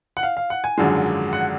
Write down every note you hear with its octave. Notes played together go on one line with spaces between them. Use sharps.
F#5
F5
F5
F#5
G#5
G#1 F#2 D3 F3 G#3
F#5